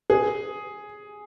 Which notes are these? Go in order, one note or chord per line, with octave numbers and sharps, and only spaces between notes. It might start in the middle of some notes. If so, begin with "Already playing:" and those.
G#4